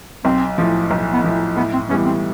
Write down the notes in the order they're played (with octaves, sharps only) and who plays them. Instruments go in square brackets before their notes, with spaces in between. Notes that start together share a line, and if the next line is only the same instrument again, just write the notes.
[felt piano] B1 [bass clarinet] C4
[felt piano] A2 F3
B1
[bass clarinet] B3
[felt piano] A2 F3
[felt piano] A2 [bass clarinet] B3
[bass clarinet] C4
[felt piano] E3 G3 B3 [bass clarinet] C#4
[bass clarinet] C4